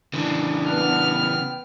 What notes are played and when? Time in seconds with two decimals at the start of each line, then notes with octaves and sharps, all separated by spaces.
0.13 C#3 E3 D4
0.68 B3 F6
1.15 G5